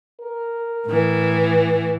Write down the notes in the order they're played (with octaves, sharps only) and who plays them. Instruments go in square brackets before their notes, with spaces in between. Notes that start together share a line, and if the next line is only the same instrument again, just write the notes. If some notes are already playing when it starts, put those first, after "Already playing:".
[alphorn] A#4
[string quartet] A2 E3